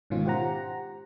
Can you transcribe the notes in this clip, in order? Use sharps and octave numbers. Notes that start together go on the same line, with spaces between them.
G#2 B2 D#3 C#4 F4
F4 G4 C5 F#5 A#5